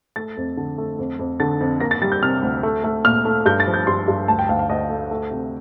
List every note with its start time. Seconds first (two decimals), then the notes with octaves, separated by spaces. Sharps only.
0.16 A3 A6
0.37 F2
0.57 D3
0.78 A3
0.99 F2
1.19 F2
1.40 D3 A6
1.61 F2
1.80 A#3 A#6
1.91 A6
2.02 G3 A6
2.12 G6
2.22 C3 F6
2.42 D2
2.63 A3
2.84 A3
3.04 A#2 F6
3.25 A3
3.46 G2 G6
3.60 A6
3.67 F3
3.74 G6
3.87 G2 C6
4.08 G2
4.28 D2 A5
4.39 G5
4.49 D2 F5
4.59 F5
4.69 D2 D#5
4.90 A3
5.11 A3
5.31 C3